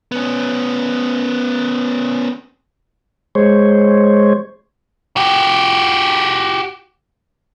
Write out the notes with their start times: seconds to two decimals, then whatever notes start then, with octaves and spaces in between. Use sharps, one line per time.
0.12 B3 C#4
3.35 G#3 C5 C#5
5.17 F#4 G4